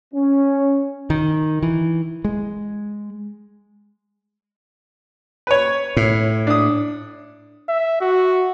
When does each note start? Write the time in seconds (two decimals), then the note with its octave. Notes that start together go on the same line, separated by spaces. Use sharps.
0.14 C#4
1.10 D#3
1.62 E3
2.25 G#3
5.47 B4 C#5
5.97 A2
6.47 D4 D#6
7.69 E5
8.01 F#4